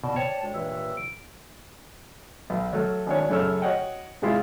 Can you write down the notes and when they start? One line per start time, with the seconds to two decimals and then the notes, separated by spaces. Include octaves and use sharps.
0.04 B2 D5 A5
0.16 C5 C#5 G5
0.42 D2 G#3
0.54 G2 A#2 E3 E5
0.97 D7
2.50 B1
2.73 F#3 A3 F6
3.06 G#1 D4 C#5
3.30 F#2 C#3 A3 C#5 E6 F6
3.62 F#4 C#5 D#5 F#5 G5
4.22 G#2 C3 G3 G#3 E4 F4